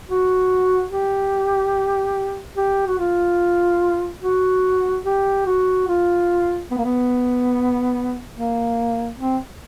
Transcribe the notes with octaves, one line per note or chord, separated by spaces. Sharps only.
F#4
G4
G4
F#4
F4
F#4
G4
F#4
F4
B3
A#3
B3
A#3
C4